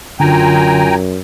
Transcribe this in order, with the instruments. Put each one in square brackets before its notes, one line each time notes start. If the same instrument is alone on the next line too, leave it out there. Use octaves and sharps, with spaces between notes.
[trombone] F#2 [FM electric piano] D3 [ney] F4 [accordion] G5 G#5 A#5